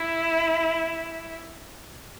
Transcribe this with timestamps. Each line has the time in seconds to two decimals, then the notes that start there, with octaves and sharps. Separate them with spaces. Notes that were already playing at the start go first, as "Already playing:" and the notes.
Already playing: E4